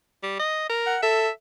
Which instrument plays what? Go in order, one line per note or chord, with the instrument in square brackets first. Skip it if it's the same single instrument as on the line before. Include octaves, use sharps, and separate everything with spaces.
[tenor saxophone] G3
D#5
A#4
[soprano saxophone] F#5
[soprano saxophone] A4 [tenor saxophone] E5